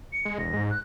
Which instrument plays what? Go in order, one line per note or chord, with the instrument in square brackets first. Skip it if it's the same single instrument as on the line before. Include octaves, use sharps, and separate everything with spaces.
[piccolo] C#7
[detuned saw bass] G#3
[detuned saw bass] E1 [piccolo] A#6
[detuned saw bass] G#2
[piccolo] F#6